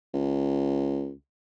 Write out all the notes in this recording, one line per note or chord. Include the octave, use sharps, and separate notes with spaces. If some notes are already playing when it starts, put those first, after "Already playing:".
C#2